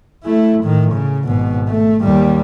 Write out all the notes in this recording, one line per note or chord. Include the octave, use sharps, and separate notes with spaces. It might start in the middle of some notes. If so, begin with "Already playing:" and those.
A3 E4
A2 D#3
C#3
G#1 B2
A3
D#2 G3